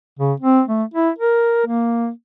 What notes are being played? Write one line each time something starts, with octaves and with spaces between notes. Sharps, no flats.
C#3
C4
A3
E4
A#4
A#3